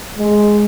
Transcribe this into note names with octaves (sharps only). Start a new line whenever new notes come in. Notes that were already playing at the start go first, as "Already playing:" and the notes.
G#3